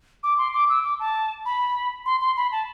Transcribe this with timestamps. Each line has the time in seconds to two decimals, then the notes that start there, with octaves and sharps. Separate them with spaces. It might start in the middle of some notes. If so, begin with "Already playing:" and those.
0.23 D6
0.38 C6
0.54 D6
0.69 E6
0.84 D6
1.00 A5
1.46 B5
2.06 C6
2.21 C6
2.37 B5
2.52 A5